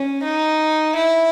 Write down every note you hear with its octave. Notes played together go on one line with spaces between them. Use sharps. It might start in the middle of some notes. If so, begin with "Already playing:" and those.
Already playing: C#4
D#4
E4